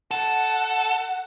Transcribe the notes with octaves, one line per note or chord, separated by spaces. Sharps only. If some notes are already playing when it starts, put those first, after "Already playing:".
A4 F#5